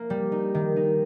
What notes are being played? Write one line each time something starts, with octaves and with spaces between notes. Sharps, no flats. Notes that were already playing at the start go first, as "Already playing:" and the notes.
Already playing: A#3
G3
D#4
D#3
D#4